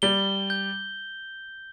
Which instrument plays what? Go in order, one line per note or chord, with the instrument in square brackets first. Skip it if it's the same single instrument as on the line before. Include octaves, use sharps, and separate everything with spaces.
[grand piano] G3 [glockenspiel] G7
[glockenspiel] G6